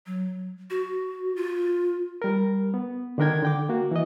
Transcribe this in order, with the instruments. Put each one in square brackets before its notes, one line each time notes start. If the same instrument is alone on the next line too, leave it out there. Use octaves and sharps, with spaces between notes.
[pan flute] F#3
F#4
F4
[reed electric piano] G3 A#4
B3
D3 D#3 D4 A#4 G5 G#6
D3 G5 D6
A#3 F#4
E3 D#5